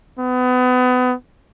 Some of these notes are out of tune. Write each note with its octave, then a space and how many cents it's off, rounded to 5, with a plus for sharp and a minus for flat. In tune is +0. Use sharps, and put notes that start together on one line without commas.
B3 +30